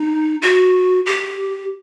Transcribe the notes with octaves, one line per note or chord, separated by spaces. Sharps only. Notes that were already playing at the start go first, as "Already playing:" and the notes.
Already playing: D#4
F#4
G4